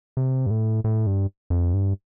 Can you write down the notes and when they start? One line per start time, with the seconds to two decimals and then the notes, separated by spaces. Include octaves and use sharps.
0.17 C3
0.46 G2
0.50 A2
0.84 A2
1.07 G2
1.50 F2
1.73 G2